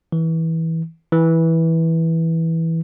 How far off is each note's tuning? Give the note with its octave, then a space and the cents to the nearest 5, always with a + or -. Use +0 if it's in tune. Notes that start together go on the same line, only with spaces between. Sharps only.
E3 -20
E3 -10